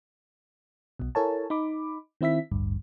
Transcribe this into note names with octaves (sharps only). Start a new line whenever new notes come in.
B1 B2
E4 A4 A#4 C#5 G#5 A5
D#4 B5 D6
D#3 C4 E4 E5 B6
A1 D2 G2